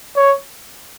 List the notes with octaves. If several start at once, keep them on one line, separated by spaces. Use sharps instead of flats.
C#5